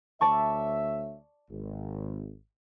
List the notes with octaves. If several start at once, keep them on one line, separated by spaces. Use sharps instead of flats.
D2 C#5 D5 E5 A5 C#6
G#1